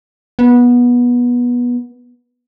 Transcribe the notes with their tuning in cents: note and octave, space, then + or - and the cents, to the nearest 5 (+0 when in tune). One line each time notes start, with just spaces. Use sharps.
B3 -20